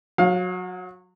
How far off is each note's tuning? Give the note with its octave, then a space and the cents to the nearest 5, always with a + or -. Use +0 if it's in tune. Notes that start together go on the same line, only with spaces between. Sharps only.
F#3 -25 F5 +25